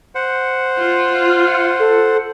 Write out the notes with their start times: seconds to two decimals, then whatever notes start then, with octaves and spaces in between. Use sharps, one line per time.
0.15 C5 F#5
0.78 F4
1.80 A4